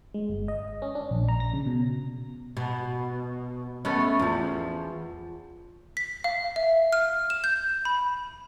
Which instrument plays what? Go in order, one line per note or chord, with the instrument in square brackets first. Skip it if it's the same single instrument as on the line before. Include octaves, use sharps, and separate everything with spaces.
[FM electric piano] G#3
G1
D#5
C#4
D4
A#1
A#5
A#6
C#3
B2
[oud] B2
A3 B3 C#4
E2 F3
[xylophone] B6
F5
E5
F6
E7
G6
B5